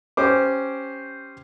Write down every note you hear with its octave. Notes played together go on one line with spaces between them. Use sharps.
C#4 G4 C5 D6